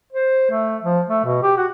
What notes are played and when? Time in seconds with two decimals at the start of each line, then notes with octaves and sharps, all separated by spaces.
0.12 C5
0.50 A3
0.83 F3
1.08 A3
1.25 B2
1.43 G4
1.57 F#4